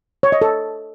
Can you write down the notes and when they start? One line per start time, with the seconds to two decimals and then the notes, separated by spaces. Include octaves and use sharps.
0.23 C#5
0.32 D#5
0.42 A4